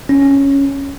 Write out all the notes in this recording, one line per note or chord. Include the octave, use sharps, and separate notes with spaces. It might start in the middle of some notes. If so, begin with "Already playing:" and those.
C#4